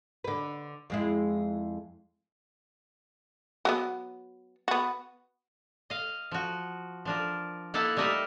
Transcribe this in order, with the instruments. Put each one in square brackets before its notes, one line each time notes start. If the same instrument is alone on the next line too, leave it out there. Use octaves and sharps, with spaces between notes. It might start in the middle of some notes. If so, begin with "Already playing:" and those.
[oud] D3 B4
F2 G#3 E4
[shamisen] F#3 A#3 B3
B3 F#4
[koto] D#5 F5
F3 F#4
F3 D4 A#4
A#3 D#4 E4 A4 F5 F#5
G3 A3 D#4 A#4 D#5 E5